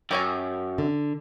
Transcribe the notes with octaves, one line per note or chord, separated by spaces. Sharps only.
F#2 G4 C#5 G#5
D3